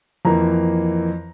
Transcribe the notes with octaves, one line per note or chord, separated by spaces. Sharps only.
F2 E3 A#3 A#5